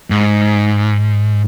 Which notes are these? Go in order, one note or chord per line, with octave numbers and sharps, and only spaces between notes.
G#2